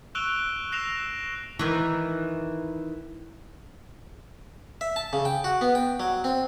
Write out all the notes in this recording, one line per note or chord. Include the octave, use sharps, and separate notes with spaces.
C#6 E6 F#6 D7 F7 G7
E6 F#6 A#6 C7 E7 F7
D#3 E3
E5
A5
C#3
G5
F#4
B3
G5
F#3
C4